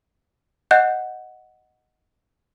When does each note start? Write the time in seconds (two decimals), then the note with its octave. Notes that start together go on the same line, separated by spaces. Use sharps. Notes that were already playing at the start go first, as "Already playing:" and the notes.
0.71 D#5 F#5 F#6 G6